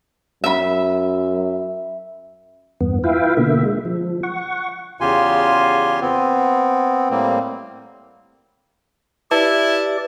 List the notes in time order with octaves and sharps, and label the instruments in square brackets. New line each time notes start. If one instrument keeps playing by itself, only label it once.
[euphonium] F#2 [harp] E5 B5
[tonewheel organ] E2 G2 B3
E4 F4 B4 E5 F5 G5
B2 D3 A#3 E5
G#3
F3
F#5 C#6
[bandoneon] E2 C#3 F4 G4 G#5 C6
B3 C4
A2 G3 A#3 C4
[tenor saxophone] E4 [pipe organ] G4 D5 [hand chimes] B4 A5 E6